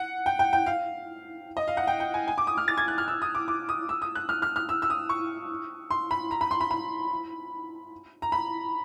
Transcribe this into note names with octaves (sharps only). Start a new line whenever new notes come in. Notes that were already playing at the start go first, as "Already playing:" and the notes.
Already playing: F#5
G5
G5
G5
F5
D#5
F5
F#5
G5
G5
G#5
G#5
D6
D#6
F6
A6
G#6
F#6
F6
E6
D#6
D6
D6
D#6
E6
D#6
F#6
F6
F6
F6
E6
E6
D#6
C#6
C6
B5
A#5
B5
C6
B5
B5
A#5
B5